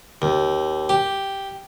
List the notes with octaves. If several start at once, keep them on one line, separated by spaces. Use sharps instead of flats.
D#2
G4